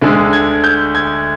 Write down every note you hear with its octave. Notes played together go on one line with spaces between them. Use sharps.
D2 D3 G#3
G#6
G6
G#6